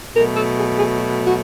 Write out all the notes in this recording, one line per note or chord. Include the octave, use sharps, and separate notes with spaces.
B2 F#3 A3 A#4
A4
G#4
G#4
F#4
F#4